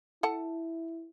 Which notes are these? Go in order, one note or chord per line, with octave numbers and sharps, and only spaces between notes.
E4 A4 F#5 A5